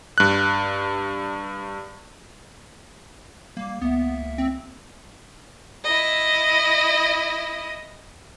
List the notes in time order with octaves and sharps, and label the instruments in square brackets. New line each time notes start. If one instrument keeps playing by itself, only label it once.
[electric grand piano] G2 F#6
[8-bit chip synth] G3 [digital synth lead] A#3
[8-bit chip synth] C#2 A#3 E5 [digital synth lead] B3
[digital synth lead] C4
[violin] E4 D#5